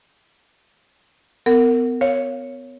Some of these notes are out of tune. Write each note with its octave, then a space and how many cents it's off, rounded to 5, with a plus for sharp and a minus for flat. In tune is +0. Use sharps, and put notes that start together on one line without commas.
B3 +35 A#4 -25 F#5 +0
C#5 +0 F5 +0